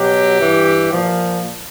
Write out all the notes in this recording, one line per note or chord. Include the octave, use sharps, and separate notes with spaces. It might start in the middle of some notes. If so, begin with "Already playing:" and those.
Already playing: B2 F#3 G4
G2 E3
A#2 F3